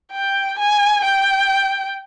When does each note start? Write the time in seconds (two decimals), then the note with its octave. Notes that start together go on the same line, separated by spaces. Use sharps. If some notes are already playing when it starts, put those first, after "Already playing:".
0.12 G5
0.59 G#5
1.04 G5